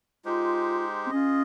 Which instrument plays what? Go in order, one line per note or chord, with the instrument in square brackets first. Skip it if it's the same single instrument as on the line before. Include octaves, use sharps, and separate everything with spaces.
[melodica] G#3 D#4 G4 C5 [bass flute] F4
[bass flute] C4
[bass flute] C#4 [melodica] F4 G#4 D#5